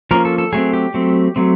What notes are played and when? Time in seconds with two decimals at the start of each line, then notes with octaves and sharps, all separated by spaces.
0.11 F3 A#3 C#4 A#4
0.25 A4
0.38 A4
0.52 F#3 A3 C4 G#4
0.73 G4
0.94 F#3 A3 C4
1.36 F#3 A3 C4